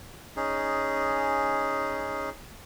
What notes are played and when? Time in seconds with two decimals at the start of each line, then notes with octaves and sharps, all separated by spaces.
0.36 C#4 D#4 G#4